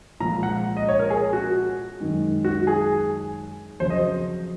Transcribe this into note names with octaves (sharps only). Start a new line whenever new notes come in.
A#2 F3 G#3 A#5
F#5
D#5
C#5
A#4
G#4
F#4
F#2 D#3 G#3
F#4
G#4
F2 C#3 F#3 C5
D#5